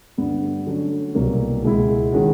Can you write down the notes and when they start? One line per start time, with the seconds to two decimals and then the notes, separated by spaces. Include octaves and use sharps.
0.17 G2 D3 G3 B3
0.66 D3 F#3 A3 C#4
1.15 C2 B2 F#3 A#3
1.64 C#2 B2 G#3 B3 E4
2.12 D#3 G#3 C#4 F#4